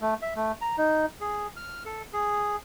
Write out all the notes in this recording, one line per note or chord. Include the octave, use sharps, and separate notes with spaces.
A3
E5
A3
A#5
D#4
G#4
F6
A4
G#4